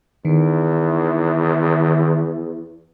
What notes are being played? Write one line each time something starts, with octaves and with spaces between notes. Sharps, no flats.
E2 D#3